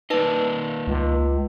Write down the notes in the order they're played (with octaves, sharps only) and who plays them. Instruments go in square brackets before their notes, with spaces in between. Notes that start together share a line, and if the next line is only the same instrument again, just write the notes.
[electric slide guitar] A#3 D5 D#5 [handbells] D#4 B4 A5
[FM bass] C#2